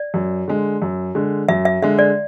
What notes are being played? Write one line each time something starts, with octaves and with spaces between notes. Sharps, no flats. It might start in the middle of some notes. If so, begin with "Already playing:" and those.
Already playing: D5
F#2
D3 G#3
F#2
D3 G#3
F#2 E5
E5
D3 G#3 E5
D5